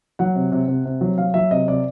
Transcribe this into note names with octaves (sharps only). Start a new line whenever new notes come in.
F#3 F#5
C3
C3
C3
C3
F#3
F#3 F5
F#3 E5
C3 D#5
C3 D5